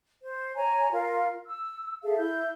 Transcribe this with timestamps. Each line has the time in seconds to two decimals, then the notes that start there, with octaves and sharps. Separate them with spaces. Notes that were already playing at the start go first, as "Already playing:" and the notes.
0.22 C5
0.56 C#5 G#5 A#5
0.93 F4 A#4 F5
1.46 E6
2.03 G#4 A4 E5 F5
2.18 E4 G6